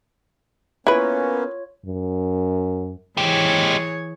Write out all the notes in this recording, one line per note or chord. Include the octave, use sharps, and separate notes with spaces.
A#3 B3 C#4 E4 F4 B4 C#5
F#2
E3 G#3 G4 G#4 C#5